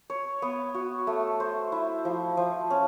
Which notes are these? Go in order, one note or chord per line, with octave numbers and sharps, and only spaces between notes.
C#5
B3
F#4
A3
C5
E4
F3
F3
C#4